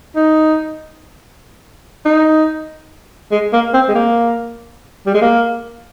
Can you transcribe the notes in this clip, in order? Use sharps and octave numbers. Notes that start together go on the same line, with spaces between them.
D#4
D#4
G#3
A#3
C4
G#3
A#3
G3
G#3
A#3